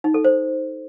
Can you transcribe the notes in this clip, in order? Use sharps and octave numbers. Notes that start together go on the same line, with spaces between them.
D#4
A4
C5